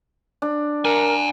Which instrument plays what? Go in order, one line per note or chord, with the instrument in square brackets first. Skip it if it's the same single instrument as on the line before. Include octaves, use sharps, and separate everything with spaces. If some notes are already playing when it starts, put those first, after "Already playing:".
[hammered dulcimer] D4
[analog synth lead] A#4 [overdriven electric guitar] F#5 G#5